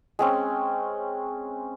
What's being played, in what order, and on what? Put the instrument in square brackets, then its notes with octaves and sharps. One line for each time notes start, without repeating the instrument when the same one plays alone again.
[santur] G#3 C4 C#4